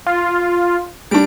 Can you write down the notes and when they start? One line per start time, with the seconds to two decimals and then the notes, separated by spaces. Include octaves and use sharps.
0.07 F4
1.11 G3 D4 D7